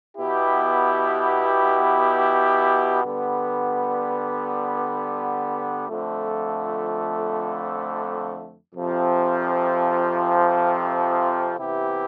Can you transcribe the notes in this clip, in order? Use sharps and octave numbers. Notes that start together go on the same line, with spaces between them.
B2 B3 E4 G4
D3 G3 B3
F2 D3 F3 A3
F2 C3 F3 C4
C3 E3 B3 E4 G4